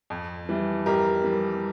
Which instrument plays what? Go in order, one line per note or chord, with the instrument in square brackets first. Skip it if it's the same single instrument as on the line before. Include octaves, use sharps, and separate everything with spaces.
[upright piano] F2
E3 G3
F2 G4 A#4
E3 G3